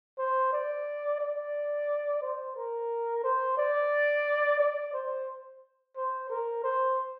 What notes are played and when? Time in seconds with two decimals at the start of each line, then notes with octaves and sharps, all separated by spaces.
0.18 C5
0.52 D5
1.20 D5
2.22 C5
2.56 A#4
3.24 C5
3.58 D5
4.60 D5
4.93 C5
5.96 C5
6.30 A#4
6.63 C5